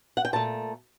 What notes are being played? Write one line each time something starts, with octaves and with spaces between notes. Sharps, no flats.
F#5
G5
A#2 A3 A5